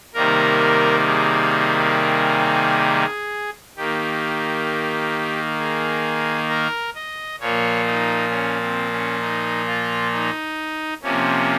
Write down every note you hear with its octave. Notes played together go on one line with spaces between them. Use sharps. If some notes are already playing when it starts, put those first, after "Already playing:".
C3 D#3 G3 A#3 A#4
G#4
D#3 A#3 G4
G#4
A#4
D#5
A#2 F3 A#3 C#5
D#4
C#4
C4
C#4
D#4
F4
D#4
C3 F3 A#3 C#4